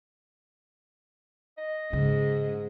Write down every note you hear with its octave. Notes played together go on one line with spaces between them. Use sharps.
D#5
G#2 C#3